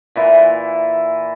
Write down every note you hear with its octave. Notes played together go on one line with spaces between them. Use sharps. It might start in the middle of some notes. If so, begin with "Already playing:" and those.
A#2 E3